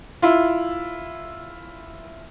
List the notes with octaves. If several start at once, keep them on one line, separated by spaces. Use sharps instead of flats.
E4 F4